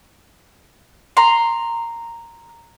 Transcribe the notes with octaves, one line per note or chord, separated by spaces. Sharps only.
A#5 C6